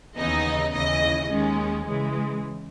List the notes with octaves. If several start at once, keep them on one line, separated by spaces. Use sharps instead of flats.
D#2 C#3 E3 B3 D#4 D#5
D#2 C#3 E3 D#5
D#2 D#3 G#3 C#4
C#3 E3 G#3